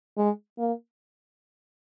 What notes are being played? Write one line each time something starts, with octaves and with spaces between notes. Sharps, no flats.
G#3
A#3